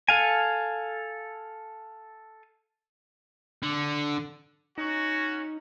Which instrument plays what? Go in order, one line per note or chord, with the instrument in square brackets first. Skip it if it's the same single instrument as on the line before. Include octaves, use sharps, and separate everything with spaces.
[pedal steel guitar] A4 F5 G#5
[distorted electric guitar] D3
[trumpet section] C#4 F#4 [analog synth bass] D#4